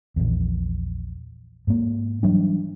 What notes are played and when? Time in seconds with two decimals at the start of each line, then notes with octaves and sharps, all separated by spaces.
0.16 A#1 E2
1.67 G#2 A#3
2.23 E3 F#3 G3 D4